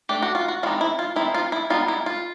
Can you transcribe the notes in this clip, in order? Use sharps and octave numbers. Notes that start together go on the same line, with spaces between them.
A3 D4 G4
F#4
F4
F#4
E3 G#3 C4 D#4 F4
E4
F4
E3 G#3 C4 D#4 E4
F4
E4
G3 B3 D#4 F4
E4
F4